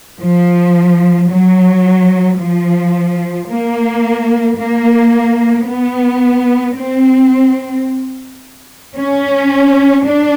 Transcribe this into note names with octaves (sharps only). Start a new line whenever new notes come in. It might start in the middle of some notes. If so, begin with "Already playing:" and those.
F3
F#3
F3
A#3
A#3
B3
C4
C#4
D4